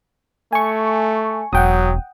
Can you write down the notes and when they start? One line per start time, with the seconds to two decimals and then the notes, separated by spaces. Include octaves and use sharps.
0.53 A3 G#5 C#6
1.53 E1 F#3 F#5 G5 D#6